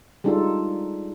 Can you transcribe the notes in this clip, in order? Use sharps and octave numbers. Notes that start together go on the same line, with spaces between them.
G3 G#3 D4 D#4 F4 A4